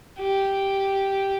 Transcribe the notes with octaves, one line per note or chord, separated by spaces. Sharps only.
G4